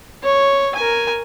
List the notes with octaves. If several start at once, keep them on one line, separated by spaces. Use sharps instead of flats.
C#5
A#4 G#5